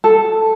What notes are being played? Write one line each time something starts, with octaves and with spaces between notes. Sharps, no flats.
A4